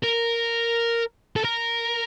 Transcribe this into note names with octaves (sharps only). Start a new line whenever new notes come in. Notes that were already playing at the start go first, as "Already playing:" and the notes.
A#4
A4
A#4